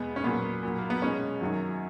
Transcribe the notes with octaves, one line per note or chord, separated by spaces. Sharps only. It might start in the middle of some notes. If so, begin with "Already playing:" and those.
Already playing: E2 B2 G#3 B3
C#4
A#2 F#3 B3
A#2 F#3
A#3
B3
B2 G#3 C#4
F#2 D#3 F#3